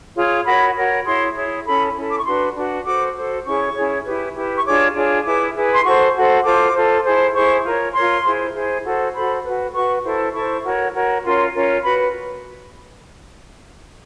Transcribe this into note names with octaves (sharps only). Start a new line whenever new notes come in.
F4 G#4 C#5
F#4 A#4 C#5 B5
F#4 A#4 C#5
E4 G#4 C#5 C6
E4 G#4 C#5
C#4 E4 A4 B5
C#4 E4 A4
D6
C#6
D4 F#4 B4 C6
D4 F#4 B4
F#4 A4 C5 D6
F#4 A4 C5
C#4 E4 G#4 C#5 C#6
C#4 E4 G#4 C#5
E4 G4 B4
E4 G4 B4
C#6
D4 F4 G#4 C#5 D6
D4 F4 G#4 C#5
E4 G#4 B4 D6
E4 G#4 B4
C6
F#4 A4 C5 C#6
F#4 A4 C5
F4 A4 C5 D6
F4 A4 C5
E4 G#4 C5
E4 G#4 C5 C#6
F4 A#4 C#5
F4 A#4 C#5 C6
E4 G#4 C5
E4 G#4 C5
F#4 A4 C5
F#4 A4 C5 B5
F#4 B4
F#4 B4 C#6
E4 A4 C5
E4 A4 C5 C#6
F#4 A#4 C#5
F#4 A#4 C#5
C#4 F4 A#4 C#5 C6
C#4 F4 A#4 C#5
F#4 B4 B5